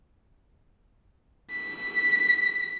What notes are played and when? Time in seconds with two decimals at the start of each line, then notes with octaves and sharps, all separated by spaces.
1.52 B6